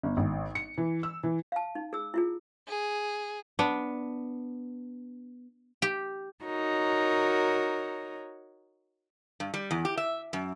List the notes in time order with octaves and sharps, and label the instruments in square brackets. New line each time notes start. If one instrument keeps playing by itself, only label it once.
[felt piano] G1
G#1
C#7
E3
E6
E3
[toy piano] F5 A5
D#4
G#4 E6
E4 F4 G#4
[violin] G#4
[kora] B3 D4
[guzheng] G4
[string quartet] D#4 F#4 A#4 C#5
[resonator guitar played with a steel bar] G2
G3
E2
G4
E5
F#2